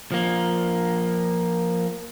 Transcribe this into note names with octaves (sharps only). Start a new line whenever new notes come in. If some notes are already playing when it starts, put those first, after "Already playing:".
F3 A#3